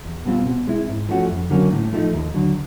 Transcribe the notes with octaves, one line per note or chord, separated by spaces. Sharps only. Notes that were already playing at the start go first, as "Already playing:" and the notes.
E2
B2 G3 C4 F4
B2
G#3 C4 E4
G#2
F3 A3 C#4 F#4
F2
D3 F#3 A#3 C#4
A2
F3 A3 C4 D#4
D#2
D3 F#3